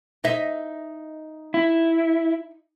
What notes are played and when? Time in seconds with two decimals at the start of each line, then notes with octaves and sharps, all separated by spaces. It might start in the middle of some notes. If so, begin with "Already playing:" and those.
0.24 D#4 D#5 E5
1.54 E4